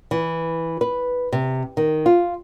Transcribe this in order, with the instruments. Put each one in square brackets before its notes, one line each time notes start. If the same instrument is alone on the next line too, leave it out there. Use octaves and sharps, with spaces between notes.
[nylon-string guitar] E3
B4
C3
D#3
F4